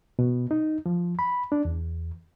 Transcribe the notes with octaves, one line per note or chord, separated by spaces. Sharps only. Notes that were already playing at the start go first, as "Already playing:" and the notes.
B2
D#4
F3
B5
D4
E2